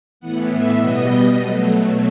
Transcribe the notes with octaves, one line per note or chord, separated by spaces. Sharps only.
A2 E3 B3 F#5
E5
B2 G3 B3 D#5
B2 F#3 A3